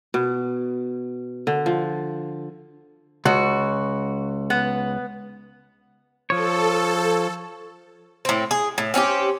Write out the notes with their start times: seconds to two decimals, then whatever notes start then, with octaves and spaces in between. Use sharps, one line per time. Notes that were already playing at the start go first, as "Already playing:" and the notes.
0.14 B2
1.47 D3
1.66 F3
3.25 C#2 F#4
4.50 B3
6.30 F3 A4 C#5
8.25 A2 C4
8.51 G#4
8.78 A2
8.94 C4 C#4 E4 G4